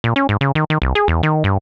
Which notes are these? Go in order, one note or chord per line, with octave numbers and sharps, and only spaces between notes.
A#2
C#4
G#2
C#3
D#3
D#3
C2
G#4
E2
D#3
G2